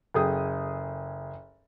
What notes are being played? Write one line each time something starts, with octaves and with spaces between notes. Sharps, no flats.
F#1 G#4 A4 G5 D#6